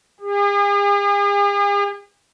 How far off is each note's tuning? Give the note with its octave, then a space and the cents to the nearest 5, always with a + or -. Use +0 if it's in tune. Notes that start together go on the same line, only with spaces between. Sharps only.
G#4 -45